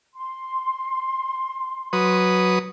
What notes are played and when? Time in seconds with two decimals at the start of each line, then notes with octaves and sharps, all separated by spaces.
0.15 C6
1.93 F#3 B4 D#6